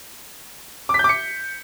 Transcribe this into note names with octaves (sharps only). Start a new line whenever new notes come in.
D6
B6
G6
D6
C#7